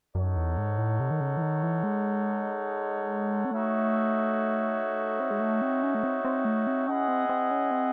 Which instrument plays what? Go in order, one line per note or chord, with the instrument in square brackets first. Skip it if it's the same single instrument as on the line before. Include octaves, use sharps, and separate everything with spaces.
[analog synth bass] F#2 [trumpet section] D#4 A4 C#5 F#5
[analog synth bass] E2
G#2
A2
C3
D#3
C#3
E3
D#3
E3
G#3
C4
[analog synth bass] A3 [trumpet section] D#4 F#4 C#5 E5
[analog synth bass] C4
G#3
A3
C4
C#4
A3
C4
C4
A3
C4
[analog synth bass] C#4 [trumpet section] E4 G#4 D#5 F#5
[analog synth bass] C4
C4
C#4
C4